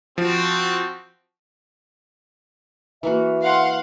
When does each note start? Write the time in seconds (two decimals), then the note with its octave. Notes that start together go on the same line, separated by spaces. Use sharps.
0.18 F3 C4 F#4
3.03 E3 A#3 F#4 E5
3.41 F5 F#5 C6